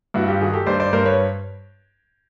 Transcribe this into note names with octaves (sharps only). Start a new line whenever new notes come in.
G2 E4 F#4
F4 G4
D#3 F#4 G#4
G4 A4
G2 C5 D5
C5 D5
G2 A#4 C5
B4 C#5